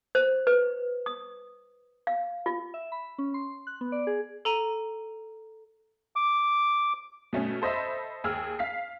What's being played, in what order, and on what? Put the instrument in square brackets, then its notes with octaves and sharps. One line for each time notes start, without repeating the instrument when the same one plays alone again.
[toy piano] C5
B4
D#6
F5
F4
[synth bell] E5
B5
C#4
C6
F#6
B3
D5
G#4
[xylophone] A4 A#5 D#7
[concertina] D6
[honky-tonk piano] B2 A3 C#4
A4 C5 D#5 E5 B5
D#2 G#4 E6 F6
F5 B6 C7